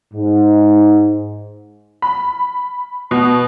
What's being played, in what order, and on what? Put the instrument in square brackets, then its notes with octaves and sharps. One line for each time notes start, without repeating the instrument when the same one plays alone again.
[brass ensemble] G#2
[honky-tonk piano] B5
B2